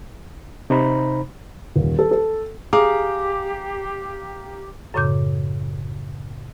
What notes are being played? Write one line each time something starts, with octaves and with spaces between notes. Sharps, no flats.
C3 D#4 C5 A#5 B5
D#1
A4
A4
G4 G#4 F5 A#5 D6
F#2 A2 C#3 D6 G6